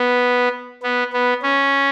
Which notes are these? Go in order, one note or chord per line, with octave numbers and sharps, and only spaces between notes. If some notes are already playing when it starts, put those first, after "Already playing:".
Already playing: B3
B3
B3
C#4